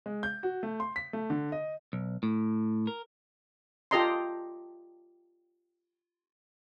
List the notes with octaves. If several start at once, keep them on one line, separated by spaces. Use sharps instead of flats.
G#3
G6
F#4
A3
C6
B6
A3
D3
D#5
B1
A2
A#4
F4 G4 A4 D#5 A#5 C6